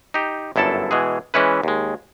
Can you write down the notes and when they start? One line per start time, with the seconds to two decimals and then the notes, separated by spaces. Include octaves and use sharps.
0.14 D#4 G4
0.56 G1 F#2 E4 A4 A5
0.91 B2 E3 G#3 G#4
1.34 E3 G#3 C#4 E4 B4
1.63 D#2 G#3